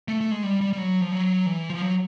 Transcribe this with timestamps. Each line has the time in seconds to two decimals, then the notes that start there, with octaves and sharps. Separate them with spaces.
0.08 A3
0.21 A3
0.31 G#3
0.43 G3
0.61 G3
0.73 G3
0.78 F#3
1.01 F3
1.12 F#3
1.46 E3
1.70 F3
1.82 F#3